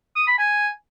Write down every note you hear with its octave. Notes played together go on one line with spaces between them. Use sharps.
D#6
B5
G#5